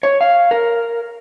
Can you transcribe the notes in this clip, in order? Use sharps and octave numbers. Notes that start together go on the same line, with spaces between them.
C#5
F5
A#4